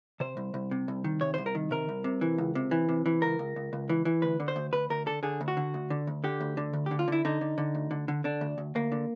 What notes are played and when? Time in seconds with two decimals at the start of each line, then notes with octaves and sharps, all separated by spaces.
0.20 C3 C5
0.37 C2
0.54 C2
0.71 C3
0.88 C2
1.04 D#3
1.21 C3 C#5
1.34 C5
1.38 C2
1.46 A#4
1.55 D#3
1.71 C3 A#4
1.89 C2
2.04 C3
2.21 E3
2.38 C#2
2.55 C3
2.71 E3
2.89 C3
3.06 E3
3.22 C#2 A#4
3.39 C#2
3.56 C#2
3.73 C#2
3.89 E3
4.05 E3
4.22 D2 B4
4.40 D3
4.48 C5
4.56 D2
4.73 D2 B4
4.90 D2 A#4
5.06 D3 A4
5.23 D3 G#4
5.41 D2
5.48 F#4
5.57 D3
5.74 D2
5.90 D3
6.07 D2
6.24 D3 G4
6.41 D2
6.57 D3
6.73 D2
6.86 G4
6.91 D3
6.99 F4
7.08 D3 E4
7.25 D3 D#4
7.41 D3
7.58 D3
7.75 D2
7.91 D3
8.08 D3
8.24 D3 D4
8.41 D2
8.58 D2
8.75 D2 A#3
8.92 D3